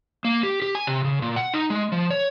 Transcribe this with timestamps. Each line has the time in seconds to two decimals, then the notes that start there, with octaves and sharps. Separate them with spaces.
0.25 A#3
0.43 G4
0.62 G4
0.75 G#5
0.87 C3
1.04 C#3
1.22 A#2
1.36 F#5
1.54 D#4
1.70 G#3
1.92 F3
2.10 C#5